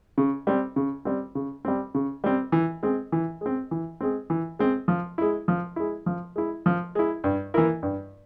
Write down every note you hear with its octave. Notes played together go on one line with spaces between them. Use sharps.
C#3
G3 C4
C#3
G3 C4
C#3
G3 C4
C#3
G3 C4
E3
G#3 C4
E3
G#3 C4
E3
G#3 C4
E3
G#3 C4
F3
G#3 E4
F3
G#3 E4
F3
G#3 E4
F3
G#3 E4
G2
E3 A#3 E4 A#4
G2